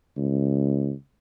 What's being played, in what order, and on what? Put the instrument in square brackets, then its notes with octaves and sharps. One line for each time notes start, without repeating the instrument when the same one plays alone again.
[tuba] C#2